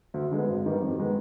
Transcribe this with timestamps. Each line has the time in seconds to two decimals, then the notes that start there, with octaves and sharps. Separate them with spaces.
0.14 D2
0.31 D3 G#3 B3
0.48 G#1
0.64 G2 D#3 G3 B3
0.81 F2
0.99 D#3 G#3 B3